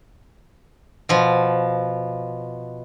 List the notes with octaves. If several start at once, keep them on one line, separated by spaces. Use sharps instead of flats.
B2 F3